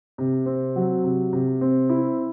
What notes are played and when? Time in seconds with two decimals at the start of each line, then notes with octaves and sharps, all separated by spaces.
0.18 C3
0.46 C4
0.76 F#3
1.04 C3
1.33 C3
1.61 C4
1.89 E4